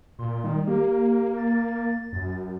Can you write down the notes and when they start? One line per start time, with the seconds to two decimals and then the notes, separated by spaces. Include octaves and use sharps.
0.19 A#2 C6
0.44 D#3 G3
0.67 A#3 G4
1.38 A6
2.12 F#2